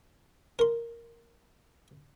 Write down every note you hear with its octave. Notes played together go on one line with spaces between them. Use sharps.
A#4 C6